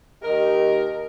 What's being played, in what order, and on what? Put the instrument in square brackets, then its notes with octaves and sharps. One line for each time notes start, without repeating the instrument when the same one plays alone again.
[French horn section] D#2 G4 D#5 [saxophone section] A#4